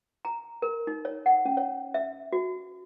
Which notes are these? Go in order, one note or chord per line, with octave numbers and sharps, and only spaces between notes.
A#5
A#4
D#4
C#5
F#5
C#4
C#5
E5
F#4